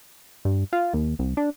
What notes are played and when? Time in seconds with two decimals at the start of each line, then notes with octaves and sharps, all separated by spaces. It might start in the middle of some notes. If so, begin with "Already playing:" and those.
0.45 G2
0.73 F4
0.94 D#2
1.19 C2
1.37 D4